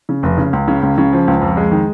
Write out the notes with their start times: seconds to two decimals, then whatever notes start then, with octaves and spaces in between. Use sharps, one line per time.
0.09 C#3
0.23 F1
0.38 C#3
0.53 C#2
0.68 C#3
0.82 C#2
0.98 C#3
1.13 F3
1.28 C#2
1.41 F2
1.57 G#3
1.71 D#3